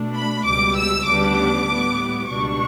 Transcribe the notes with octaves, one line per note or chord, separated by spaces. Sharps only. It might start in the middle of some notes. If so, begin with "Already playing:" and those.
Already playing: B2 A3 D4
B5
C#2 B2 G3 D6
E6
D2 C#3 G3 B3 D4 D6
A2 G3 B3
C#2 B2 G3 D4 C#6